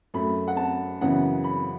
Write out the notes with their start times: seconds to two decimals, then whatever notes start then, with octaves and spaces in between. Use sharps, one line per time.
0.14 F#2 F#3 A3 B5
0.48 F#5
0.57 A5
1.01 F#2 C#3 E3 B3 F#5
1.44 B5